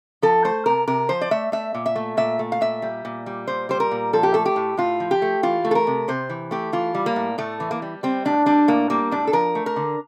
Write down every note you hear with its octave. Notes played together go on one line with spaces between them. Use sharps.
F3 A4
A3 C5
C3 A#4
C3 A#4
F3 C5
D5
A3 E5
A3 E5
A#2
E5
A3
A#2 E5
A3
F5
A#2 E5
G3
A#2
G3
A#2 C5
G3 C5
A#4
A#2
F3 A4
G4
A3 A4
G4
A2
A2 F4
F3
G4
A3
E3 F4
A3
A4
A#4
C3
C3 C5
E3
A3 G4
E3 F4
G3
A#3
A2
A2 A3
E3
A#3
G3
G3 C4
A2 D4
G3 D4
A2 A#3
G3 A#3
A2 D4
A4
F3 A#4
A3
A#4
D3